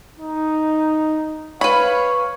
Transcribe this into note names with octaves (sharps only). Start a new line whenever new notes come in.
D#4
B4 C#5 F5 B5